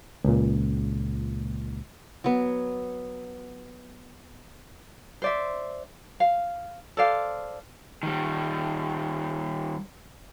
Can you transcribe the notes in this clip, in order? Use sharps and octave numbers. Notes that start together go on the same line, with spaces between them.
C#2 A#2
F#3 B3
C5 D5 E5
F5
A4 C5 D5 F5
D#3 G3